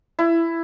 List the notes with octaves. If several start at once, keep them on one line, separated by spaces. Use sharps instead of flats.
E4